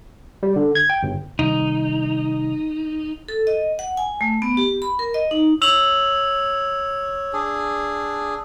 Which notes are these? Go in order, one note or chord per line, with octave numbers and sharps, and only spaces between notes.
G3
D3
G#6
G5
G1
C3 D#3 G3 D#4
A4
D#5
F#5
G#5
A3
B3
G4
B5
A#4
D#5
D#4
C#5 E6 F7 F#7
D4 G#4